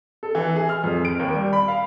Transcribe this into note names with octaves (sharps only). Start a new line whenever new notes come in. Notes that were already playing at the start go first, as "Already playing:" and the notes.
A4
E3
G#4
F6
F2
D7
D#2
G3
B5
F5